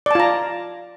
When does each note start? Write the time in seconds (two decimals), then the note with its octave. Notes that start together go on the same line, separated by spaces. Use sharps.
0.06 D5
0.11 A5
0.15 F4
0.20 A#5